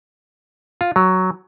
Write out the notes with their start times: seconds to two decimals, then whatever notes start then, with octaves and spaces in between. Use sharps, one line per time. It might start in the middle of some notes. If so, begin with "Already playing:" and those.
0.81 F4
0.96 F#3